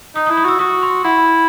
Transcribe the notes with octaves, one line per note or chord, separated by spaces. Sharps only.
D#4 D#6
D#6
E4
D#6
F#4 E6
F#4 D#6
C6
E4 F#5